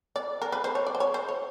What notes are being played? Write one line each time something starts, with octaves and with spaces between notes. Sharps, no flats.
D5
A#4
B4
C5
C#5
D5
C5
C#5
C5
C#5